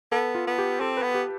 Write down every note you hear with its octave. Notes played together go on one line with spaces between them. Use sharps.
B3 A4
F4
B3
G4
C4 A4
B4
B3
G4